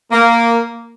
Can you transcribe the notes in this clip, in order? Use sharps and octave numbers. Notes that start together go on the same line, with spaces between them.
A#3